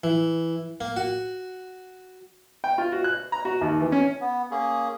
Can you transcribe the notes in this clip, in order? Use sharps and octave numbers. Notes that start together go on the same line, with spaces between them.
E3
A#3
F#4
G5
F4
F#4
F#6
A#5
F#4
D#2
E3
C#4
B3
A#3 C#4 G#4